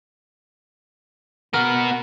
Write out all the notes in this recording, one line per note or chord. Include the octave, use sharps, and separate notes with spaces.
B3 F#4 A#4